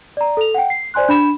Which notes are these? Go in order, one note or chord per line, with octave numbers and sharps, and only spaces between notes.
D5 A#5
A4 F7
F#5 G5
C7
C5 D5 G#5 C6 F#6
D4 B5 E7